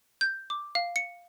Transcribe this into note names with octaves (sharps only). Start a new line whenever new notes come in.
G6
D6
F5
C#7